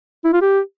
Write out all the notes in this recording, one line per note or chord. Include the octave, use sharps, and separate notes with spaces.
E4
F4
G4